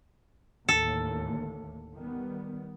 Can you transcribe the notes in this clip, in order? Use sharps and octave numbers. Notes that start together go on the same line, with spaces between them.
D#2 A2 D3 A4
D#3 G3 B3